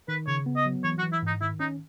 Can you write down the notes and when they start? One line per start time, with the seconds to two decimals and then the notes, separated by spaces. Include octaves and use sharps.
0.08 D#3 B4
0.28 C#3 C#5
0.46 B3
0.56 D#5
0.65 F#3
0.84 E3 C#5
0.99 F#4
1.03 E3
1.12 E4
1.22 G#2 D#4
1.41 D#3 E4
1.60 C#4 D#4